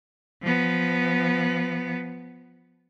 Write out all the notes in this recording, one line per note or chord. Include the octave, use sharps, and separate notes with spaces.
F3 B3